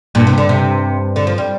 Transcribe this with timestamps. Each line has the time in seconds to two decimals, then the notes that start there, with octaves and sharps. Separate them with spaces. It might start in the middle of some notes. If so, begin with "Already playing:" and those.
0.15 G2 A#2
0.27 C3
0.38 D3
0.49 C3
1.16 D3
1.27 F3
1.38 G3